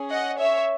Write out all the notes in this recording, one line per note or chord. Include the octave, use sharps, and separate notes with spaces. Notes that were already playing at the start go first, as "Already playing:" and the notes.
Already playing: C#4 G#4
D#5 F#5
C#5 E5